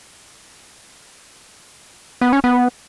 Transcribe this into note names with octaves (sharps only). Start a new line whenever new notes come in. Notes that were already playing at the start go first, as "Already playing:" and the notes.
B3
C#4
B3